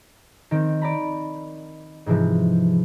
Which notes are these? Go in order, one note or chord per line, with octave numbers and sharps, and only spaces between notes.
D#3 C4
D5 A#5 B5
G#2 C3 E3 F3